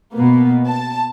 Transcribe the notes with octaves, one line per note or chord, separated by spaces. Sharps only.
B2 A#3 B3
A5